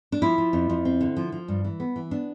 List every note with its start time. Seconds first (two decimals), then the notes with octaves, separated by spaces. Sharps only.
0.12 D4
0.22 F3 E4
0.38 F3
0.53 F2
0.69 F2
0.85 C4
1.01 D3
1.17 F3
1.32 F3
1.48 G2
1.64 E3
1.80 B3
1.96 E3
2.11 B3 D4